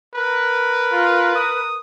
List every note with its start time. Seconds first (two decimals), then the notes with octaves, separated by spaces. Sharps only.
0.14 A#4 B4
0.92 F4
1.35 D#6